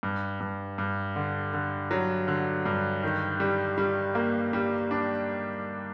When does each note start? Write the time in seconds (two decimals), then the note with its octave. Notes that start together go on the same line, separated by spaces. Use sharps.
0.03 G2
0.40 G2
0.78 G2
1.16 D3
1.54 D3
1.91 F#3
2.28 D3
2.66 G2
3.03 D#3
3.40 G3
3.78 G3
4.15 A#3
4.53 G3
4.91 D4